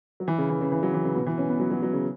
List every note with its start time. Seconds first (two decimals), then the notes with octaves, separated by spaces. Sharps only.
0.20 F#3
0.28 E3
0.38 C#3
0.50 E3
0.61 C#3
0.72 E3
0.83 F#3
0.94 E3
1.05 C#3
1.16 B2
1.27 E3
1.38 C#4
1.49 B3
1.60 F#3
1.71 F#3
1.83 F#3
1.93 C#3